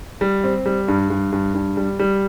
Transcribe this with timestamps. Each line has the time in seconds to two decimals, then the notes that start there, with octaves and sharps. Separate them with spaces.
0.21 G3
0.44 C4
0.66 G3
0.88 G2
1.10 G2
1.32 G2
1.54 G2
1.77 G3
1.99 G3